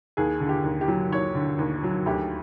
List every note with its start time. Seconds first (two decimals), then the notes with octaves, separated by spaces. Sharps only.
0.17 D#2 G#4
0.40 D3
0.49 G4
0.64 D#2
0.81 G4
0.88 F#3
1.11 D#2 C#5
1.35 D3
1.59 D#2
1.83 F#3
2.06 D2 G4